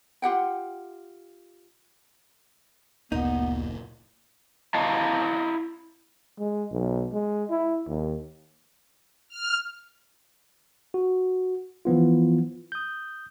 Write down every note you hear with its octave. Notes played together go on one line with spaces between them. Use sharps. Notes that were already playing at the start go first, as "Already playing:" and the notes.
F4 G4 F#5 G5
F#1 D2 A#2 A#3 B3 D#4
E4 D#5 F5 A5 A#5
G#3
B1
G#3
E4
D#2
F6
F#4
E3 F3 B3 F4
D#6 G6